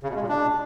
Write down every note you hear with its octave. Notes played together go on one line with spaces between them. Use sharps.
C#3
B2
G#3
A#2
D4